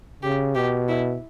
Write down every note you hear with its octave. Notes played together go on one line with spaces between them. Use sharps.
C#3 G4
B2 G4
E4